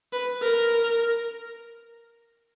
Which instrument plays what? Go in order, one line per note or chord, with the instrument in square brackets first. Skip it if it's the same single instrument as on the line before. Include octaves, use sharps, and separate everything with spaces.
[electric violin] B4
A#4